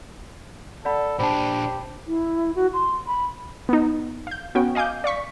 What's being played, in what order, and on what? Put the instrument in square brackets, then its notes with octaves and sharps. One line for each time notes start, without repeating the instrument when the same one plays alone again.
[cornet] A4 [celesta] D5 F#5 B5
[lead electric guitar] A#2 D4 [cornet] G4 [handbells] C5 A5 [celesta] B5
[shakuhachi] E4
F#4
C6
B5
[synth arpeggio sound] B3 D#4
F5 G6
B3 C#4 F#4 G5
D#5 F5 G#5 D6 G6
D5 F5 C#6 B6